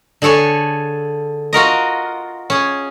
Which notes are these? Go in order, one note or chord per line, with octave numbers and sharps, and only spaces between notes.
D3 G#4 A4 C#5 G#5
F4 F#4 A#4 D#5
C#4 G#4